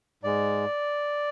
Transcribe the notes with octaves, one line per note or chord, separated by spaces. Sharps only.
G#2 G#3 D5